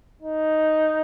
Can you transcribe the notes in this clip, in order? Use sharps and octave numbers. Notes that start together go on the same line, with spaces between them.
D#4